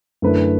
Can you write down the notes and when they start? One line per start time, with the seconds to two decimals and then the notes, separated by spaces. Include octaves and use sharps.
0.22 F#2 D3 A3 E4 B4